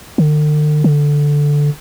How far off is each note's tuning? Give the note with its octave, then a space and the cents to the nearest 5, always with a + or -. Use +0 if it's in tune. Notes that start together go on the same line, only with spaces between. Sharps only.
D3 +45
D3 -5